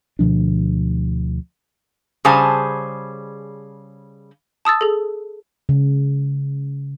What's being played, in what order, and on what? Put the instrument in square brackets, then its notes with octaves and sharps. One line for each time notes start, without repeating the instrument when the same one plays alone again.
[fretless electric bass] D2 B2 F3 D4
[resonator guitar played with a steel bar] C#3 G3 G#4 C5 G#5 A5
[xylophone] A5 D#6 E6 A6
G#4 A4
[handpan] C#3